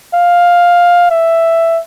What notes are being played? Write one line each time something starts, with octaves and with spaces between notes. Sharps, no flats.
F5
E5